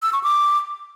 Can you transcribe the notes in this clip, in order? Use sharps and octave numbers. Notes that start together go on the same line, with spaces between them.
E6
C#6
D6